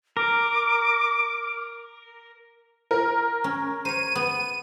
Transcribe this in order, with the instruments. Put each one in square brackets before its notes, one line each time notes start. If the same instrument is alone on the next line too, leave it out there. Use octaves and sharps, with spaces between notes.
[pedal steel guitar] A#4 [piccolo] D6
[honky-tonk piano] A#4
[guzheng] C#4
[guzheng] C5 C#5 [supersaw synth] D#7
[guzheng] B3